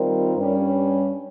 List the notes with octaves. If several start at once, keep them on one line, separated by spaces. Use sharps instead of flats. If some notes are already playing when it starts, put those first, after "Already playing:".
Already playing: D#3 G3 C4 F4 A#4
G2 G3 C#4